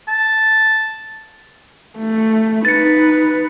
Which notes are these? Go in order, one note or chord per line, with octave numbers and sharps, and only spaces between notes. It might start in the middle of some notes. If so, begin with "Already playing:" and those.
A5
A3
D#4 B4 A6 C#7